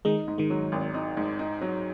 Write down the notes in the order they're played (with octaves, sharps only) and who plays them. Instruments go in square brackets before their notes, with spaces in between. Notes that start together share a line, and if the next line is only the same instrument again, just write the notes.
[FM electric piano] D#3 G#3 [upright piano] D#4
[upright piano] G#2
[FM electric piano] D#3 G#3
[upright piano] F#3
G#1
D#4
G#2
D#4
F#3